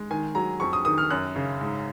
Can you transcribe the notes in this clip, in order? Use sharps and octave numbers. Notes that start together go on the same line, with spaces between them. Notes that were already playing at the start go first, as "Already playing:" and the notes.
Already playing: G#3
D#3 G#5
F#3 A#5
F2 C#6
D#6
D#3 D#6
F6
F#2 F#6
C#3
G#2